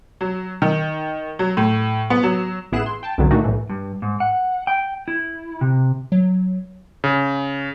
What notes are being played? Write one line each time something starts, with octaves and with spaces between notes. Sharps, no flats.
F#3
D#3
F#3
A2
B3
F#3
A1 B3 E4 G#4 F#6 E7
C6
G5 A5
C2 F2 B2 D3 F#3
A#2 D#3 A3 D4 D#4 F#4
B1 A2 E3
G2
G#2
F#5
G5
E4
C3
F#3
C#3